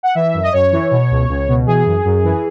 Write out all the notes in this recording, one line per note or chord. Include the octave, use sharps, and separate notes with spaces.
F#5
E3 E5
F#2
D#5
F#2 C#5
E3
B2
C#2
C#2
B2
E3 G#4
F#2
F#2
E3